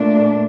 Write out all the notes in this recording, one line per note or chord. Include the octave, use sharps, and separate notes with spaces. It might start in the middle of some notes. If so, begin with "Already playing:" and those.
Already playing: A#2 A3 D4